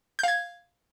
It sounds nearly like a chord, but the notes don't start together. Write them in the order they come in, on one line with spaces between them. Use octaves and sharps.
G6 F5 G#6